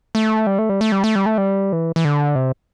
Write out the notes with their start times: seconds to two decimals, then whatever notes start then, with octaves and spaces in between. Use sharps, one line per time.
0.15 A3
0.47 G3
0.59 A3
0.69 G3
0.81 A3
0.92 G3
1.04 A3
1.16 G3
1.26 A3
1.38 G3
1.73 E3
1.96 E3
2.05 D3
2.35 C3